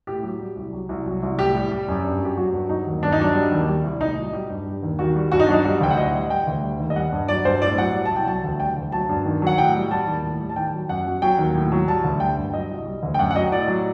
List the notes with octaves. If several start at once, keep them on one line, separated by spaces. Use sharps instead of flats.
A2 G4
F#3
G3
C2
F#3
C2
F#3
C2
A2 G4
G3
G3
F#2
G2
F#3 G4
F#3 F#4
G2
F#3 D#4
D#2
G2 D4
D#4
F#3 D4
G3
D#2
G3
C2
A2 D#4
F#3
G3 G4
G2
G3
D#2
D#3 F#4
G3
G2 F#4
D#4
F#3 D4
D#4
G3 F#4
D2 G5
F#5
A2 D#5
G3
G3 G5
D2
G3
D#2
D#5
G3 F#5
G2
F#3 D5
G2 C5
A2 D5
F#3 F#5
G3
A5
C2
G5
F#3 A5
D2
G3 G5
D2
F#3 A5
G2
D#3
F#3 F#5
A2 G5
G3
G3 A5
D#2
A2
G3
A5
D#3 G5
F#3
F#2 F#5
F#3
F#3 G5
D#2
A2
F#3
G3 A5
D2
G3 G5
G2
F#3 D#5
C2
G3
D2
G5
F#2 F#5
F#5
F#3 D#5
A2 D5
F#3